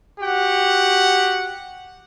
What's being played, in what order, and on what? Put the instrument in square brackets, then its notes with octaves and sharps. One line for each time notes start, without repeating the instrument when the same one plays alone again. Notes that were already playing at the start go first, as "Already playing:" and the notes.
[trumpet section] F#4 G4 F#5